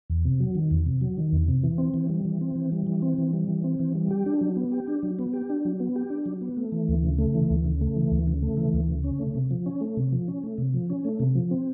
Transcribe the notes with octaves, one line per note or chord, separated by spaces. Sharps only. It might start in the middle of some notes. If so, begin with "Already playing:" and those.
E2
C3
F#3
D#3
E2
C3
F#3
D#3
E2
C3
E3
C4
E3
G3
E3
C4
E3
G3
E3
C4
E3
G3
E3
C4
E3
G3
G4
D4
F#3
B3
G4
D4
F#3
B3
G4
D4
F#3
B3
G4
D4
F#3
B3
A3
E3
D2
C#3
A3
E3
D2
C#3
A3
E3
D2
C#3
A3
E3
D2
C#3
C#4
A3
C3
F3
C#4
A3
C3
F3
C#4
A3
C3
F3
C#4
A3
C3
F3
C4